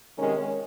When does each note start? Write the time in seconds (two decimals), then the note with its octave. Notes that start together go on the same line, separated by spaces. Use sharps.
0.16 C3 D#3 G#3 C#4 A#4